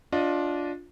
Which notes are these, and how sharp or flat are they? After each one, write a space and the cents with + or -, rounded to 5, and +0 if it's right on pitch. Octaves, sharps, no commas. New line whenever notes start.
D4 -15 F4 +15 D#5 +0